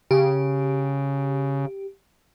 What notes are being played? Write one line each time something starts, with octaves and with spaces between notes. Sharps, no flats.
C#3 G4